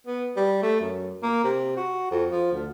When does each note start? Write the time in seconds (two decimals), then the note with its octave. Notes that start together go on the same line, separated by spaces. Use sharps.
0.07 B3
0.36 G3
0.62 A3
0.81 F#2
1.23 A#3
1.44 C3
1.77 F#4
2.11 F2
2.32 F3
2.52 D2